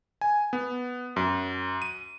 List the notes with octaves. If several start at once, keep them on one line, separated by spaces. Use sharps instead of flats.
G#5
B3
F#2
D#7